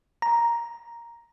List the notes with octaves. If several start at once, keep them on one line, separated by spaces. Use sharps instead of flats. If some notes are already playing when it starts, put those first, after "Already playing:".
A#5